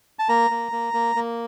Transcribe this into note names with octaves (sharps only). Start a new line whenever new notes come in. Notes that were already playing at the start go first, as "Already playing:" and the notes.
A5
A#3 A#5
A#3
A#3
A#3
A#3